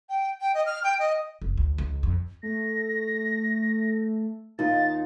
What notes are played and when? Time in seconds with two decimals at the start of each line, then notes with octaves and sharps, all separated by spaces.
0.09 G5
0.41 G5
0.54 D#5
0.66 F6
0.84 G5
0.99 D#5
1.42 F1
1.58 D2
1.78 C#2
2.03 F2
2.43 A3 A#6
4.59 D#2 D#4 F4 A6